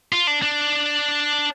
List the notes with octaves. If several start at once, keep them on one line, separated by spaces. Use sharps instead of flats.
F4
D4
D4